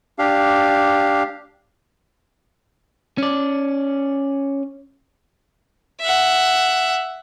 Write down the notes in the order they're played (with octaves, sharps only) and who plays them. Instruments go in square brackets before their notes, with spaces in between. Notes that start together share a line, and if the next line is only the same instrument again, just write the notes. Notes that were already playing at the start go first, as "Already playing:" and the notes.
[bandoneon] D4 G4 F5
[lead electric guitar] C#4 D5
[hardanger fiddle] E5 F#5